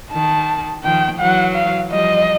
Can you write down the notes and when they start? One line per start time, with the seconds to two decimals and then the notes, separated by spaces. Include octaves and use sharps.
0.12 D#3 A5
0.84 D#3 F3 G5
1.19 E3 F#3 F#5
1.55 F5
1.90 F3 G3 D#5